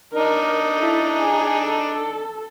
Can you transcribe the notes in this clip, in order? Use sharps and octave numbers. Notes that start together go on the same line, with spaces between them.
D4 D#4 A#4
E4 A4
G#4
A4